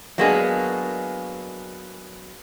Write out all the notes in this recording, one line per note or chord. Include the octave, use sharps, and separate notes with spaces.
F#3 G#3 A#3 B3 D4 G#4